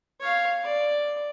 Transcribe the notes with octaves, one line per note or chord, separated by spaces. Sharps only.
C#5 F5
D5